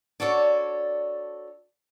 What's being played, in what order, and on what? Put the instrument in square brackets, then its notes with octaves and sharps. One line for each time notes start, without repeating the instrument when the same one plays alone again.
[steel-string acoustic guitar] D4 F#4 A4 C#5 D5